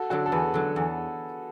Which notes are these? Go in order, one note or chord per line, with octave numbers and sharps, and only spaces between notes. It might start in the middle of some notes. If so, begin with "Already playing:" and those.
Already playing: F#4 A4
D3 F#3 F#4 A4
A4
E2 G#4 B4
D3 F#3
E2